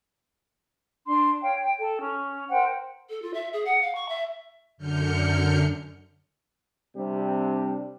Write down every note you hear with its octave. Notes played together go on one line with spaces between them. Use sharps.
D4 C6
C#5 F5 G5
G5
A4
C#4
A#4 C5 F#5 G5
A4
F4
E5
G#4
F#5
F5
C#6
E5
F#2 D3 F6 G6 C#7
C3 G3 C4 D4